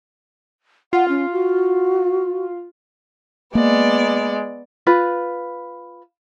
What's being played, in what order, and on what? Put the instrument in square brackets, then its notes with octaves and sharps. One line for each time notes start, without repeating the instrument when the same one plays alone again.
[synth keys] F4 [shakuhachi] F#5
[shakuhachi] C#4
F#4
[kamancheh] G#3 [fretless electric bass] A#3 [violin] B3 D5
[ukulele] F4 B4 B5